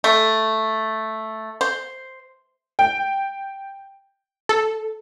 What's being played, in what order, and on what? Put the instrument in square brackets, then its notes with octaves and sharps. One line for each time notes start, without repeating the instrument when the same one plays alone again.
[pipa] A3
C5
[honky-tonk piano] G5
[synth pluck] A4